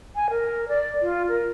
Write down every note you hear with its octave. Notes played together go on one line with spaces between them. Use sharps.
G#5
A#4
D5
F4
A#4